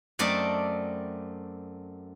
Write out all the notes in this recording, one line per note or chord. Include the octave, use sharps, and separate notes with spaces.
F#2 A3 C4 D5 D#5 A5